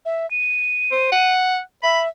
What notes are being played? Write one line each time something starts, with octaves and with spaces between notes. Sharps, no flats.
E5
D#7
C5
F#5
E5 B5